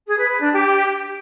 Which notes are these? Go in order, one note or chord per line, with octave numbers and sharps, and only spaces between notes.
G#4
B4
B4
D4
G4